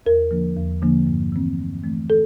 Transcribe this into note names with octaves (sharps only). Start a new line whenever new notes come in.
E2 A#4
D3 F3 A#3 D4
E2
D3 F3 A#3 D4
G2
E3 A3 C4
G2
E3 A3 C4
A4